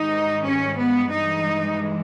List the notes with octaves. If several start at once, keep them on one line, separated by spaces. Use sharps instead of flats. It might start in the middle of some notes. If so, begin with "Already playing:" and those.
Already playing: G#2 D#3 G3 D#4
C#4
B3
G2 E3 G#3 D#4